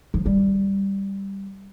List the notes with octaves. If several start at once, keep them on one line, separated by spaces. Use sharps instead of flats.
F3
G3